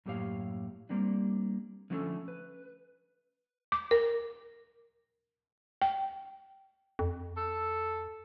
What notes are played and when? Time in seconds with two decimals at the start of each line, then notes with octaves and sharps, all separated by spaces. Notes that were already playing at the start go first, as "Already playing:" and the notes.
0.06 F#2 A2 A#3 G4 C#5 F5
0.89 G3 A#3 C4 D4
1.90 D3 F3 A3 C#4 G#4 A4
2.28 B4
3.72 D6
3.91 A#4
5.82 G5
6.99 F2
7.37 A4